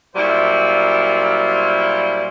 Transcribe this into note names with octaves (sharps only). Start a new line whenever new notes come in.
A#2 F#3 G3 E4 F4 C5